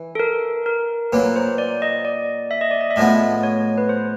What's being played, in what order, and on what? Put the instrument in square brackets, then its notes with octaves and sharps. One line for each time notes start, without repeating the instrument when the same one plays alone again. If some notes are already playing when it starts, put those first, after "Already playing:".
Already playing: [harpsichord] E3
[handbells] A4
A#4
A#4
[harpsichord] A#2 F#3 A#3 [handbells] B4
[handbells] C5
D5
D#5
D5
E5
D#5
D5
D#5
E5
[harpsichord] A2 F3 G#3 B3 [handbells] D#5
[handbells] C#5
B4
C5